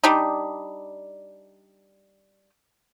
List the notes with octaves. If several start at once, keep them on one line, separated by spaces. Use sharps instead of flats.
G3 D4 D#4